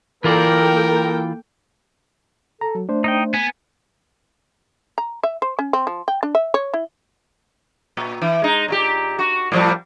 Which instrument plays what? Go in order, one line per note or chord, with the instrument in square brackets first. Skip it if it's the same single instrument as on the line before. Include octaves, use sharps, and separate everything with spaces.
[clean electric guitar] E3 F4 D5 [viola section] A#3 A4 G5 [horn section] A#4
[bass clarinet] A4 [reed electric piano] A#5
[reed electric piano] F#3
[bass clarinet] A3 [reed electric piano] D4 C5
[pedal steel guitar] D#4 D#5 G5
[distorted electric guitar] B3 [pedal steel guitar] G#5
[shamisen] A#5
E5
C5
C#4
C4
F3
G5
D4
E5
C#5
E4
[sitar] A#2
E3
G#3 D#4
A#2 F4 G4
F#4
A2 F3 G3